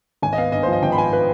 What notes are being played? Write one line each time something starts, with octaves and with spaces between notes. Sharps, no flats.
G#1 G#5
D#5
B3 F5
G2 D#5
C5
F3 D#5
G#1 G5
B5
B3 G#5
B4